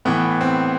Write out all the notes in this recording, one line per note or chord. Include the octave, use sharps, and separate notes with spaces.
A2 E3 B3
C4